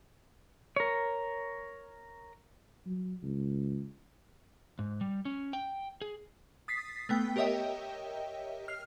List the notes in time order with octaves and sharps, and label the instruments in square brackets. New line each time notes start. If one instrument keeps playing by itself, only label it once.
[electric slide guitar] A#4 C#5
[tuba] F#3
C#2
[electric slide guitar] G#2
G3
C#4
G5
G#4
[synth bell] D#6 A6 B6 C7
A3 B3 G5 B6
G4 A#4 C#5 D#5 E5 G5
F6 C7